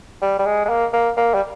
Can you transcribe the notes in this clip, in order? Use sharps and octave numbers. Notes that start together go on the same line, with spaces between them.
G3
G3
G#3
G#3
A#3
A#3
A#3
G3